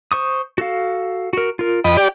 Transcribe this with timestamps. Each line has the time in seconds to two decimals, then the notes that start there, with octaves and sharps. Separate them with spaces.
0.12 C5 C#6 D#6
0.58 F#4 A4 F5
1.33 F#4 A#4
1.59 F4 A#4
1.84 F2 D#5 G5 B5
1.97 G4 D5